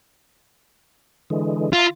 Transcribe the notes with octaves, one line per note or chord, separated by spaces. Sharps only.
D3 E3 G#3
F4 E5 A#5